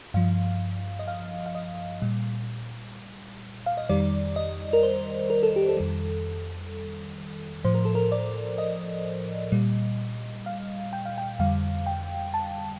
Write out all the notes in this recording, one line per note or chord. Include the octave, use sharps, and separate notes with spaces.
G2 F3 F5
D#5
F5
F5
D#5
A#2 G3
F5
D#5
F2 D#3 G3 D5
D#5
A#4
C5
A#4
A4
G4
A4
F2 D#3 G3
A2 F3 C5
A#4
A4
A#4
D5
D#5
A#2 G3
F5
G5
F5
G5
F2 D3 G3 F5
G5
A5